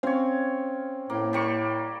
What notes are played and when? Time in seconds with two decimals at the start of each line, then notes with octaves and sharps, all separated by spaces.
0.03 C4 C#4 C#5 F5
1.10 A2 A#3
1.33 G3 A#3 C#6